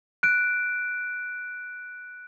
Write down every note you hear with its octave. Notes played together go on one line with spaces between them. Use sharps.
F#6 D7